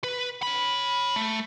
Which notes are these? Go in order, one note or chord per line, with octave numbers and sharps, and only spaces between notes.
B4
C#5 B5
A3